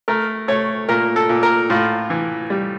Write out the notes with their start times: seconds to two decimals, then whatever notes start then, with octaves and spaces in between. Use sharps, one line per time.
0.08 A3 A#4
0.48 A3 C#5
0.89 A#2 A#4
1.16 A4
1.29 A#2
1.43 A#4
1.70 A2 F4
2.10 E3
2.50 G3